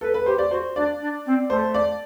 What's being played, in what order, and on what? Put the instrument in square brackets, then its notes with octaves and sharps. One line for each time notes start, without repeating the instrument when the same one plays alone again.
[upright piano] A4 [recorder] B4
[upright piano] B4
[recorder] G4 [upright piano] C5
[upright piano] D5
[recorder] F#4 [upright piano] C5
[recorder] D4 [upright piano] D5
[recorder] D4
C4
[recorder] A3 [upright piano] C5
[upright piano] D5